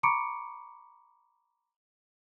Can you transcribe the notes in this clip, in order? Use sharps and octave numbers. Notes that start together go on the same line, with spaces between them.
A#5 B5 C#6 D6 C#7 D7